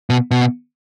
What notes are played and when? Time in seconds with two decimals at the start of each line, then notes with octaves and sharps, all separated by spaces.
0.10 B2
0.31 B2